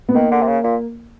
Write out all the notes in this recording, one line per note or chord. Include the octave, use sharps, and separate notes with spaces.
B3
D#3 A#3
D3
C3
C#3
A#2